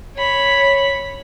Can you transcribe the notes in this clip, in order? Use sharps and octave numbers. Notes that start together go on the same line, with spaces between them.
C#5 B5